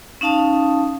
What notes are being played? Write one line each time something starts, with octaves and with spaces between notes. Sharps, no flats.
C#4 D#4 F5 A5 D#6